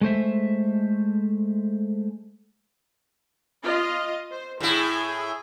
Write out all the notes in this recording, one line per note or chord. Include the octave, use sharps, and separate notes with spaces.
G#3 A3 C5 E5
F4 D#5
C5
A2 E4 G#4